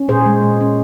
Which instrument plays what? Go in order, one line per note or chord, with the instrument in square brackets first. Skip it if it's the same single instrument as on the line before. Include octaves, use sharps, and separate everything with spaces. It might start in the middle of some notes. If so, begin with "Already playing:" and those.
Already playing: [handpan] C#4
A#2 G#4 C5
G#3
A#2
C#4